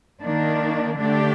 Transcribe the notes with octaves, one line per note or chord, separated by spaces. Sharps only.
D#3 A#3 D4
D3 A3 D4 G4